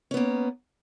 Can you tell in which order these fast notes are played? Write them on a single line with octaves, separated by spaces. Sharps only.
C#4 B3 A#3